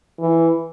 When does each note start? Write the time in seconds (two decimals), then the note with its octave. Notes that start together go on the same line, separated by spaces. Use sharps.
0.19 E3